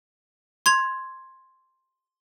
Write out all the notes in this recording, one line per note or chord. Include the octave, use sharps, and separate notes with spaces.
C6 G#6 F7